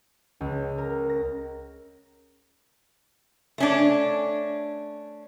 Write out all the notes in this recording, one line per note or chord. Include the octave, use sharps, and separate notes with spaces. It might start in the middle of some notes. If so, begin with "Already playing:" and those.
C#2
A#4
A#6
A3 C#4 D4